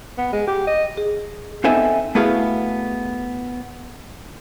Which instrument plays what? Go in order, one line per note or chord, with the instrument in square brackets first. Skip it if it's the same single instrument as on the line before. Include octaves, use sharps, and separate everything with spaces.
[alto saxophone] B3
G#3
G4
D#5
[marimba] G#4
[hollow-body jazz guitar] B3 C4 D#4 A4 E5 G#5
A3 B3 E4 F#4 G#4 F5